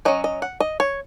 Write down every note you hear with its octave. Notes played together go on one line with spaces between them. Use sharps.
F#3 C#4 D#5
D#5
F#5
D#5
C#5